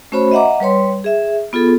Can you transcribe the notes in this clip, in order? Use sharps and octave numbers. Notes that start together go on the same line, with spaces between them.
A3 C#4 F#4 C5 C#5 B5
D#5 E5 F#5 A#5 D6
G3 B4 C#5 C6
G#4 E5
B3 F4 G#4 A4